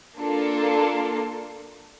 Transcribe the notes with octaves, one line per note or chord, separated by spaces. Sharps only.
A#3 D4 F4 A4